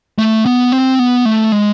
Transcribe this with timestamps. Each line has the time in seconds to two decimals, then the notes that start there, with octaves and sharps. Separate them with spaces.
0.18 A3
0.46 B3
0.72 C4
0.99 B3
1.25 A3
1.52 G#3